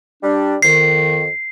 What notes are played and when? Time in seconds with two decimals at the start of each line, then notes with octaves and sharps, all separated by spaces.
0.23 G3 D4
0.62 F2 D#3 C7